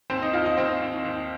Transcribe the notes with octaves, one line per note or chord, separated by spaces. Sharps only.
D#2 C4 C5
D#4 D#5
D#2 F4 F5
D#4 D#5
D#2 C4 C5
D#2
D#2